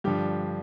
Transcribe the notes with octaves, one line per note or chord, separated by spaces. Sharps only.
G2 D3 F3 G4